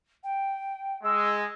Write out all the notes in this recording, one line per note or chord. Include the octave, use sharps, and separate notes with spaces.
G5
G#3 E6